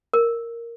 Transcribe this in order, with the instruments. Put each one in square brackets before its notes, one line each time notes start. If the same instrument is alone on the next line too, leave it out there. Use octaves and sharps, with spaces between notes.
[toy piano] A#4